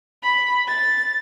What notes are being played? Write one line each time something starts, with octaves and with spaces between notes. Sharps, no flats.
B5
A6